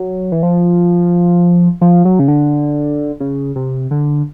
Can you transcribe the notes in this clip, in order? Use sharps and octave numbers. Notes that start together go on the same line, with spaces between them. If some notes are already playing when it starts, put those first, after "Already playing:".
Already playing: F#3
E3
F3
F3
F#3
C#3
D3
C#3
C3
D3